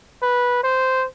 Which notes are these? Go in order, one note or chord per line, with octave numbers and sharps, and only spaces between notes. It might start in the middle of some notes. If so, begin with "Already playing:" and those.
B4
C5